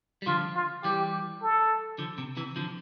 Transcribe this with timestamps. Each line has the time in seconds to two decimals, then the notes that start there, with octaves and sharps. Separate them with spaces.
0.22 G3
0.26 D3 F3 F4
0.56 F4
0.84 E3 G3 G4
1.42 A4
1.98 D3 F3
2.18 C3
2.37 C3 E3
2.56 D3 F3